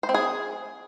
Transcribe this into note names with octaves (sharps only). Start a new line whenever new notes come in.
C5
C4
G#4